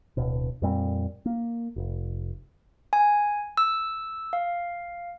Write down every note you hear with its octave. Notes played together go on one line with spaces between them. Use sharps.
D1 B2
F2 A#2 G3 C4
A#3
F1
G#5
E6
F5